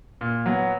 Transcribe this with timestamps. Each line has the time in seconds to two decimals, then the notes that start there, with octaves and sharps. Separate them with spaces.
0.21 A#2
0.46 F#3 B3